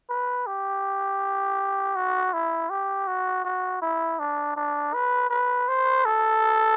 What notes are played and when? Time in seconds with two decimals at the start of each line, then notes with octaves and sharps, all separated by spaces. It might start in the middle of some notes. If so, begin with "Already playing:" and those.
0.10 B4
0.47 G4
1.96 F#4
2.33 E4
2.70 G4
3.07 F#4
3.44 F#4
3.82 E4
4.19 D4
4.56 D4
4.94 B4
5.30 B4
5.68 C5
6.05 A4